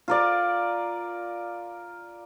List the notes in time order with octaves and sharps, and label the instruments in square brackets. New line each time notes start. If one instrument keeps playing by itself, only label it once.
[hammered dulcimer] F4 A#4 D5